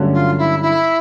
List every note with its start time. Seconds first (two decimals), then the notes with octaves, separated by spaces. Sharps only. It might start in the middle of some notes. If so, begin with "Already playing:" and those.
Already playing: G2 D3 F#3 A3 C#4
0.13 F4
0.37 E4
0.61 E4